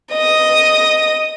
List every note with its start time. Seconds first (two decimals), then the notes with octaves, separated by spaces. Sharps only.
0.14 D#5 D#6